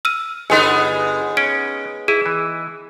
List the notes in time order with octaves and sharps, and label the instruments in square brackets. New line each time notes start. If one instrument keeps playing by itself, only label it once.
[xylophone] E6 F6 D#7
[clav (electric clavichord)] G1 [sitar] G#3 B3 D#4 [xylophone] G#5 C6
[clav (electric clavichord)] C#4 [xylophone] D7
[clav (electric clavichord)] E4 [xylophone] G#4
[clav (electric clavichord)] E3